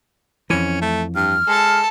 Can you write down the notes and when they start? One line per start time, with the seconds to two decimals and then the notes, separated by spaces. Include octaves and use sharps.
0.50 F2 E3 C#4
0.81 A3
1.16 G2 F6
1.48 G#3 A4 A5